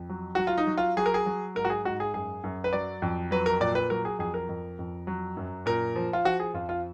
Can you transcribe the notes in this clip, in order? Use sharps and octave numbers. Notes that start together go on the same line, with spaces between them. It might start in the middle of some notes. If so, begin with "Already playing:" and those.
Already playing: F2
F#3
F#3 F#4
F4
D#4
F#3
F4
F#3 G#4
A#4
G#4
F#3
G#2 A#4
F#4
G#4
G#2 F#4
G#4
F#2 G#4
F#2
B4
F#3 D5
F2
F#3 B4
A#4
A#2 D5
B4
F#3 A#4
G#4
F2 G#4
A#4
F2
F2
F#3
F#2
A#2 A#4
F3
F4
F3 F#4
G#4
F2 F4
F4